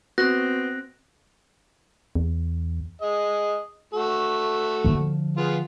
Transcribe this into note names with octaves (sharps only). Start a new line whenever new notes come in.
B3 C4 F#4 F#6 A#6
E2
G#4 D#5
A3 F#4 A4
D3 F3
B3 F4 G#4